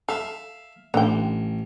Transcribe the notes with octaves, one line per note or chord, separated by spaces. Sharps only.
A4 E5 F5
A1 D3 G5